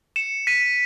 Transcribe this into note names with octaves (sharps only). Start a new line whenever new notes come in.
C#7 E7
B6 D#7